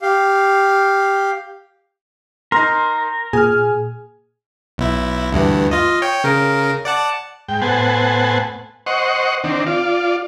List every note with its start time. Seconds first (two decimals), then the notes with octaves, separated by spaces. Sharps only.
0.02 G4 F5
2.52 D#4 A#4 C6
3.33 A#2 G#4 G#5 F6
4.78 B1 E4
5.32 D2 G2 E3
5.71 F4 D#5
6.02 C#5 G5
6.24 C#3 A#4
6.85 D5 F#5 A5
7.48 G#2 G5
7.62 A2 B3 C5 F#5 G#5 A5
8.86 C5 D#5 F#5 C#6
9.44 D#3 C4 D4
9.66 F4 D5